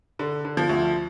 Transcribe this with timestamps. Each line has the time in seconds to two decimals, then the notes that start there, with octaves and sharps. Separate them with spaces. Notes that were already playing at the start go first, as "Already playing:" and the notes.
0.19 D3
0.45 D3
0.57 F3
0.69 D2